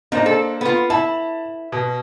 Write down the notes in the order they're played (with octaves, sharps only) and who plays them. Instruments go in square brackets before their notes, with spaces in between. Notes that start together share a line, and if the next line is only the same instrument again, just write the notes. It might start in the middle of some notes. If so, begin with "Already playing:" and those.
[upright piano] A#3 D4 C5 [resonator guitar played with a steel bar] D#4
[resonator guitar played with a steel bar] A4
B3 F4
[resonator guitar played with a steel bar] E4 [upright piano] A5
[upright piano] B2